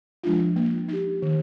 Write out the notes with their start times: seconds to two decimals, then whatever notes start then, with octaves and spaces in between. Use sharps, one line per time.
0.23 F3 G#3 D4 F4
0.56 A#3
0.88 D#4 G4
1.22 D#3